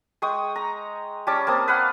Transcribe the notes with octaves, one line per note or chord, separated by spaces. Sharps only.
G#3 G5 C#6 D#6
A#5
G3 C#4 A5 D6
A#3 C4 A5 D#6
B4 F5 F#5